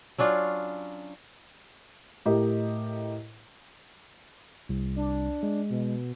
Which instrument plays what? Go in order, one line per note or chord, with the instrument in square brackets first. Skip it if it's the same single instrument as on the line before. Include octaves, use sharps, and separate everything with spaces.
[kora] F#3 C#4 D4 F4
[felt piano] A2 G4 A#4 D#5
[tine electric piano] C2
[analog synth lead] D4
[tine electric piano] G#3
[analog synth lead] B2